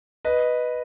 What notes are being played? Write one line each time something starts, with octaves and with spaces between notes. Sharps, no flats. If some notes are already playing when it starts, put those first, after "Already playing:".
B4 D#5